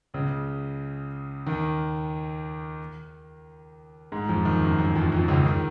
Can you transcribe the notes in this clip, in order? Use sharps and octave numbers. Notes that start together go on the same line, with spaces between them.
C#2 C#3
D#2 D#3
G#2 G#3
F2 F3
D#2 D#3
F#2
F#2
F2 F3
F2 F3
C#2 C#3
D#3